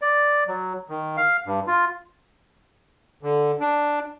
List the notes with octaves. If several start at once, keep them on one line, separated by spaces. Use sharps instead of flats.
D5
F#3
D#3
F5
G2
F4
D3
D4